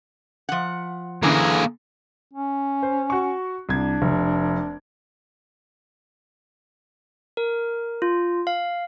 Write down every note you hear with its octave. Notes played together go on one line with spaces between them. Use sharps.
F3 F#5
F#2 D3 E3 A#3 G#4
C#4
C5
F#4 C#6
C2 D4 G#6
F1
A#4
F4
F5